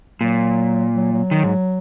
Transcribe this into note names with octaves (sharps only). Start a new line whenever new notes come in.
A#2 F#3
F#3
F#3
D#3
G#2